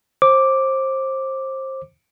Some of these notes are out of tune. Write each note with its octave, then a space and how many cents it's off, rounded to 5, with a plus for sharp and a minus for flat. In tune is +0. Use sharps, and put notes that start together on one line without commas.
C5 +25 D6 +0